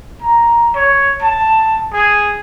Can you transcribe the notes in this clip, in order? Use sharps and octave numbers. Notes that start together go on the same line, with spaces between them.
A#5
C#5
A5
G#4